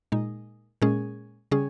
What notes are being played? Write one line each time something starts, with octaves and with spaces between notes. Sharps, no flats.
A#2 G#3 D#4
A#2 G#3 C#4 G#4
C#3 G3 C#4 G#4